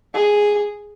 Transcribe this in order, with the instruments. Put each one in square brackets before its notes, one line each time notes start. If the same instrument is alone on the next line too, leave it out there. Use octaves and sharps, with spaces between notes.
[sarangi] G#4